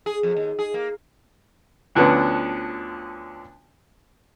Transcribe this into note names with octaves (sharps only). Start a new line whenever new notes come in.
G#4
F2
D#2
G#4
A#3
D2 D3 F3 B3 C#4